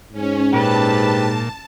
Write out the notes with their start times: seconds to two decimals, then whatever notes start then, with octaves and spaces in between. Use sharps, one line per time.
0.12 G#2 C#4
0.53 G2 A#2 G4 B4 A5